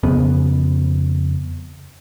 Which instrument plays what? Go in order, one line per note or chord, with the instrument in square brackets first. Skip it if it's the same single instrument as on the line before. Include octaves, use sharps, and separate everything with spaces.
[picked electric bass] F2 C#3 B3